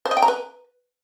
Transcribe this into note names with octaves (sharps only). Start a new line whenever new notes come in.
C5
D#5
G5
A#5
B4